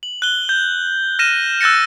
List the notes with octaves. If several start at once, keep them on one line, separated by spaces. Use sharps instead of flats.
F#7
F#6 G7
G6
F6 A#6 D#7 E7
E6 F#6 A6 A#6 C#7